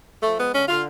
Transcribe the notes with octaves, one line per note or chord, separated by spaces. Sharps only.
F3 A3
G#3 B3
D3 C#4
D3 F4